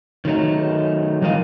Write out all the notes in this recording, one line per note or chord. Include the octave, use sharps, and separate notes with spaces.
D#3 F#3 A3 D#4
E3 G3 F4 A#4 D#5 F5